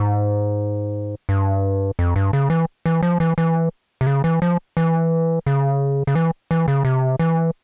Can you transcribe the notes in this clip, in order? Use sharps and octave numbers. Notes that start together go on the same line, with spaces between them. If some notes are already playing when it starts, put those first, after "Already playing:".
Already playing: G#2
G2
F2
G2
C#3
E3
E3
F3
E3
E3
C3
C#3
E3
F3
E3
C#3
C#3
E3
E3
C#3
C3
E3